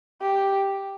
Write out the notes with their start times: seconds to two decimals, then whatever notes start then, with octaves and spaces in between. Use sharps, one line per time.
0.22 G4